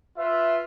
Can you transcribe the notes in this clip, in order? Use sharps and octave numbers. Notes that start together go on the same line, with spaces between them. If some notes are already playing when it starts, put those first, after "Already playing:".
F4 B4 E5